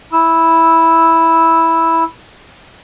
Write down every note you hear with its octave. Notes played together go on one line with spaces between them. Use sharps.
E4 E6